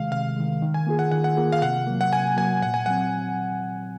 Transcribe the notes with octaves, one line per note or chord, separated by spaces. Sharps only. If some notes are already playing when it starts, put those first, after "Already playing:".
Already playing: C3 D#3 G#3 F5
C3 F5
D#3 G#3
D#3
G#5
A#3 F4 G#4
F#5
D#3 F#5
F#5
A#3 F4 G#4
F5
C3 F#5
F#3 A#3
F#5
C3 G#5
F#3 A#3 G#5
A#2 F#5
G#5
F#3 C4 F#5